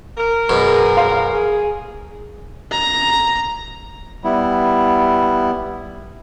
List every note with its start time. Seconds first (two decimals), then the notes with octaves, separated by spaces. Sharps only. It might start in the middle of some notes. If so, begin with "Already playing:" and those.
0.17 A#4
0.49 F#2 B2 G#4
0.97 F5 C6
1.33 G#4
2.72 A#5
4.24 G3 B3 E4